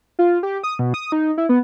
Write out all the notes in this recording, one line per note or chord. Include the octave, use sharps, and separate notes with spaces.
F4
G4
D#6
B2
D#6
D#4
E4
B3